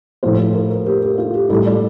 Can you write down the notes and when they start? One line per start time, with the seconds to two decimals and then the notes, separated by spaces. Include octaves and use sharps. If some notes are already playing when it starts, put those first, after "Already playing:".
0.23 A2 F3 C5
0.39 C5
0.54 A#4
0.70 A#4
0.86 G4
1.02 G4
1.18 F4
1.34 G4
1.49 A2 G3 A4
1.66 D5